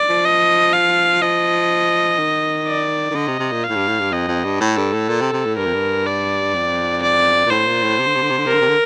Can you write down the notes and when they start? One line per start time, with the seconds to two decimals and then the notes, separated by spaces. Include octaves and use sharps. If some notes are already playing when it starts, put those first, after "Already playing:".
Already playing: D5
0.09 F3
0.25 D#5
0.73 F5
1.22 F3 D#5
2.19 D#3
2.67 D5
3.11 D#3
3.15 D3 D#5
3.28 C3
3.39 C3
3.51 A#2
3.64 F5
3.69 A2
3.76 G2
3.88 A2
4.00 G2
4.11 F2 D#5
4.28 F2
4.44 G2
4.60 A2 A4
4.77 G2
4.93 A2
5.09 A#2
5.21 C3
5.33 C3
5.45 A2
5.57 G2 A#4
5.66 F2
5.74 G2
6.06 D5
6.54 F2
7.02 D5
7.46 A#2
7.51 A2 C5
7.67 A#2
7.83 A2
7.99 C3
8.06 D3
8.15 C3
8.22 D3
8.30 C3
8.38 D3
8.46 C3 A#4
8.53 D3
8.61 C3
8.68 D3